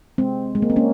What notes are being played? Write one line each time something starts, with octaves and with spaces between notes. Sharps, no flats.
G#3 C4
G#3
A#3
C4
A#3 C#4